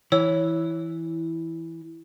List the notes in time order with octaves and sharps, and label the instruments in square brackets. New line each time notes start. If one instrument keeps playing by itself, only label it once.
[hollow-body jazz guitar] E3 [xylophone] C#5 E6